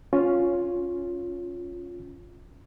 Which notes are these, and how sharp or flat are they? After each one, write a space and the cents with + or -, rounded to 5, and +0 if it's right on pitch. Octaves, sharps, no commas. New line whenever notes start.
C#4 +5 F4 +10